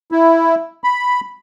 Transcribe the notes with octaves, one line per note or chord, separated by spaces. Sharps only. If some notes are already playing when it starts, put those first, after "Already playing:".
E4
B5